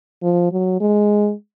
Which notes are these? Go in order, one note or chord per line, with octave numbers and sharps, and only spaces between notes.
F3
F#3
G#3